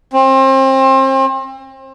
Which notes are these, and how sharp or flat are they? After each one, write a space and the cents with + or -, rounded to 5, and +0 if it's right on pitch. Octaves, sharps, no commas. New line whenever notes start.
C4 +35